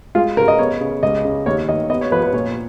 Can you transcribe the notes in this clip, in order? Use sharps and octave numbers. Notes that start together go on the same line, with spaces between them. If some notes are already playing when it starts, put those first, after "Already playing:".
G#3 F4
C#3 A#4
D#5
B3 C#5
C#3
C#2 D#5
C#3
D#2 C#5
D#3 D#5
B3 D#5
C#5
F3 B4
B4
A#2 C#5